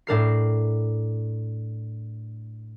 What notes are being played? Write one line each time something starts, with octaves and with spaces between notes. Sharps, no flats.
A2 D4 A#4 C7